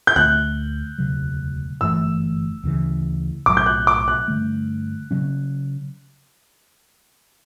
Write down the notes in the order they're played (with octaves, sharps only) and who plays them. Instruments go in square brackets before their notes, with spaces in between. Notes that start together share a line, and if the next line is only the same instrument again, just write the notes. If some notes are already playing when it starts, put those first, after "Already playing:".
[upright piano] G6
[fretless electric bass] D2 D3 A3 [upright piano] F#6
[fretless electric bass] E1 D2 C#3 F#3
[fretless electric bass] G1 F#2 E3 A3 [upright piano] E6
[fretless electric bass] D2 C#3 E3
[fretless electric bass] B1 A2 F#3 [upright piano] D6
[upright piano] G6
F#6
D6
F#6
[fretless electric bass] G2 D3 A3
C#3 F#3 C#4